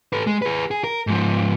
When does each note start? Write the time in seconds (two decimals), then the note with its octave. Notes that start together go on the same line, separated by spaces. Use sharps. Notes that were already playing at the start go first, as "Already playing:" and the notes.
0.13 A4 B4
0.27 G#3
0.42 G#4 B4
0.71 G#4
0.84 A#4
1.07 G#2 F3